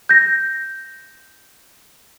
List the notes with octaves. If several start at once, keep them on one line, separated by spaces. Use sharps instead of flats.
G6 A#6